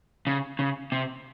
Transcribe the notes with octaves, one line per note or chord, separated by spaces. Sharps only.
C#3
C#3
C3